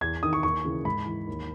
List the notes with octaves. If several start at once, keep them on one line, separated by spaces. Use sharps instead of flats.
E2 G#6
D#3 D#6
C#6
D#2 C#6
C#3 E3
G#2 B5
E3
D#2